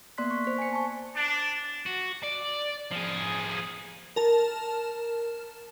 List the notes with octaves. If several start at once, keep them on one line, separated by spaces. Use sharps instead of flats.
A#3 B3 D5 C6 F#6 B6
C#6
C5 B6
G#5 C#7
A5 C#6
D4
F#4
D5
F3 G#4
A#4 A5